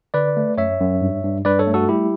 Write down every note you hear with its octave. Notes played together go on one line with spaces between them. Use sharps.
D3 B4 D5
A3
F#2 C#5 E5
F#2
G2
G2
G2 B4 D5
A4 C#5
A3
F#4 A4
G3 E4 G4